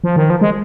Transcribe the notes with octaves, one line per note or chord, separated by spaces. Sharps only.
F3
D#3
F3
G#3